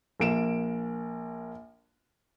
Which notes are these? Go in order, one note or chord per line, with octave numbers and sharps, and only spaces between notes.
A#1 A#3 D7 E7